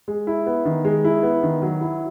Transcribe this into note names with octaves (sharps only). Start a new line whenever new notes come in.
G#3
E4
B3
D#3
G#3
E4
B3
D#3
F#3
E4